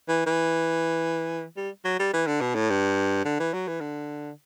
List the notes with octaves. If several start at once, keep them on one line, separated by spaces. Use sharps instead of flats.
E3
E3
G3
F#3
G3
E3
D3
B2
A2
G2
D3
E3
F#3
E3
D3